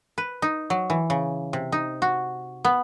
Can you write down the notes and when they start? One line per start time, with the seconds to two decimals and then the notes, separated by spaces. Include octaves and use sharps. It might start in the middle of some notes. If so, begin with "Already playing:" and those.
0.18 B4
0.42 D#4
0.70 F#3
0.90 E3
1.10 C#3
1.53 C3
1.72 D#4
2.02 F#4
2.65 B3